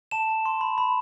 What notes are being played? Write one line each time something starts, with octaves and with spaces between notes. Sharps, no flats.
A5 E7
A5
C6
B5
B5